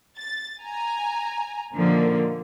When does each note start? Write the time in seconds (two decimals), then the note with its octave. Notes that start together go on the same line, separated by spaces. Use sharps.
0.18 A6
0.60 G#5 A#5
1.74 A#2 D3 D#3 F3 A#3